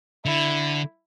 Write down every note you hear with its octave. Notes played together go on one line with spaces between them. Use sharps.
D3 E4